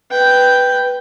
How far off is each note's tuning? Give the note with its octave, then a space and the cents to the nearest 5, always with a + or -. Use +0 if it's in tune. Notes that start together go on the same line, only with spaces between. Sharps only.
B4 +0 G5 +0